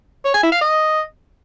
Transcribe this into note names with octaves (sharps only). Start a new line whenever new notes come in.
C#5
G#5
E4
F5
D#5